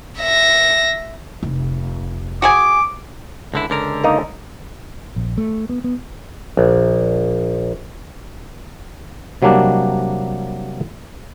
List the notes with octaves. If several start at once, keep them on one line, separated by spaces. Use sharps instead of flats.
E5 A#6
F1
F#4 G#4 G#5 D6
C#2 D3 E4
C#2 D3 A#4
A#3 D#4
A#1
A3
B3
B3
A#1
C3 F#3 G3 A#3 D4